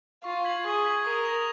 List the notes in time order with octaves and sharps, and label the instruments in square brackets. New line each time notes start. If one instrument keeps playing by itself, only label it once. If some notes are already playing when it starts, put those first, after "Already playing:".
[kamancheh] F4 [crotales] C#6
[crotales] G#6 B6 F#7
[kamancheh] G#4 [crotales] C#6
[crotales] G#6 B6 F#7
[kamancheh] A#4 [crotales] D#6
[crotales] A#6 F7